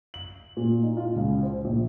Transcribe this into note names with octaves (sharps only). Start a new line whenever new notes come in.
F#7
A#2
D#4
F4
C#2
C5
A#1